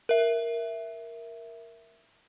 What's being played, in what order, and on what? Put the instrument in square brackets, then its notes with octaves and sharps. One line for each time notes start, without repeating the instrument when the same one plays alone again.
[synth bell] A#4 E5